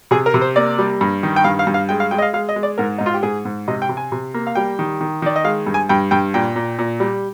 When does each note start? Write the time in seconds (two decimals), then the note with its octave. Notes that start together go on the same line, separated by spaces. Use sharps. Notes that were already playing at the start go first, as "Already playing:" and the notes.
0.11 C3 G#4
0.26 A#4
0.34 C3
0.41 C5
0.56 A#3 D5
0.79 G3
1.01 G2
1.23 D#3
1.36 G5
1.44 G2 F5
1.59 F5
1.67 G2
1.74 F5
1.89 G#3 G5
2.00 F5
2.11 G#3 G5
2.18 D#5
2.22 F5
2.33 G#3 F5
2.49 D#5
2.56 G#3
2.63 D5
2.78 G#2 A#4
2.98 G#2 D#4
3.06 F4
3.14 G4
3.23 G#2 G#4
3.45 G#2
3.68 C3 D#5
3.82 G5
3.89 C3
3.97 G#5
4.12 C3
4.34 A#3
4.47 F5
4.55 G3 G5
4.79 D#3
5.01 D#3
5.22 D#3 D5
5.36 D#5
5.44 G#3 F5
5.67 G2
5.74 G#5
5.89 G2 G5
6.11 G2 G5
6.34 A#2 G5
6.56 A#2
6.79 A#2
7.00 G3